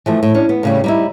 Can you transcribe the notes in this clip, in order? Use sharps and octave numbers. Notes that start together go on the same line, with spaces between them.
E3 F3 A3
A2
C#4 D4
B3
A2 C#3 G3
G3 D#4 E4